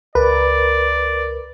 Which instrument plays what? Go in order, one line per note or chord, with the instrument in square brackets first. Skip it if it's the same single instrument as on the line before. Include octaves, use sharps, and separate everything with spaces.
[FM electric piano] C#2 A#4 [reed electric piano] B4 [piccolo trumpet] D5